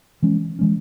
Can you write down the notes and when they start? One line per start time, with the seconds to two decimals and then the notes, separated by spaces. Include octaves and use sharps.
0.22 E3 G#3 C#4
0.59 E3 G#3 C#4